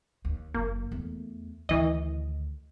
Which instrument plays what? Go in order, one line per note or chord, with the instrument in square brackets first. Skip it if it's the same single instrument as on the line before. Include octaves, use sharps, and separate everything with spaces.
[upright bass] D#2
[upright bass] F#1 [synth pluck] A#3
[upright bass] E2 A3
[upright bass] D2 D#3 [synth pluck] E3 D#5